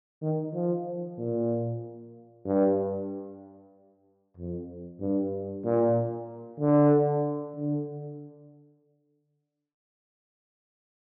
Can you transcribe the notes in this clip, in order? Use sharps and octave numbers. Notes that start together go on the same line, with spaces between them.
D#3
F3
A#2
G2
F2
G2
A#2
D3
D3